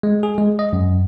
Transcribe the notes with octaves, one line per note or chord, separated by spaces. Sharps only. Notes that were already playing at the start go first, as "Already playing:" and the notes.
G#3
G#4
G#3
D#5
F#2